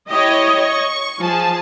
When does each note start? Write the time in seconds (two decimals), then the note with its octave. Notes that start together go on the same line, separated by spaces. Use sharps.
0.10 E4 G4 C#5 D#5
0.60 C#6
1.22 F3 G#4 G#5 A5